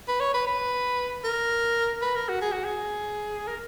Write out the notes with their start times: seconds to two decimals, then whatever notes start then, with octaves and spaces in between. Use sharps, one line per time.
0.08 B4
0.20 C#5
0.34 B4
0.47 B4
1.24 A#4
2.02 B4
2.16 A#4
2.29 F#4
2.42 G#4
2.52 F#4
2.65 G#4
3.48 A#4